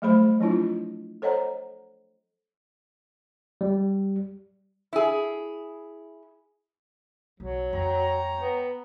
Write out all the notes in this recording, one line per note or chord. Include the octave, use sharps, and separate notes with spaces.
F#3 G3 A3 G#4 C5 B5
F3 F#3 C4 D4 E4 F4
A4 C5 C#5 D#5 F#5 A#5
G3
E4 G#4
B1 F#3
F2 G#3 C#5 G5 A#5
B3